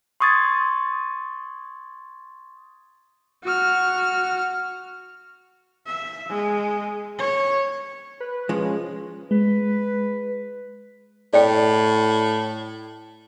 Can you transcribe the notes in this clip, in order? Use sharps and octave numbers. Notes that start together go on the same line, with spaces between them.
C6 C#6 D#6 G#6 A6
F#4 F6
E5
G#3
C#5
B4
F3 G#3 C#4
G#3 B4
A2 D5 G5